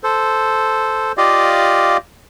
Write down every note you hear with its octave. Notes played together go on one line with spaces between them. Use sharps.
A4 C5
F4 G4 D5 D#5 F5